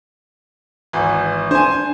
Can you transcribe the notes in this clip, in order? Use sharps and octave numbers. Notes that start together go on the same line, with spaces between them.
G#1 E3
D4 C5 G#5